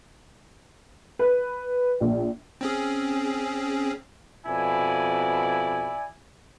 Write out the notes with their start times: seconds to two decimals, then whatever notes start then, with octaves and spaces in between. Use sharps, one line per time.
1.19 B4
2.00 A#1
2.61 C4 C#4 G#4
4.46 F2 B2 E4 D5 G#5